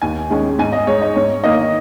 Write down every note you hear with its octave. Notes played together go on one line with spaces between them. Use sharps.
D#2 G#5
D#3 G#3 C#4
G#2 G#5
D#5
G#3 D#4 C#5
D#5
G#2 C#5
D#3 A#3 D#5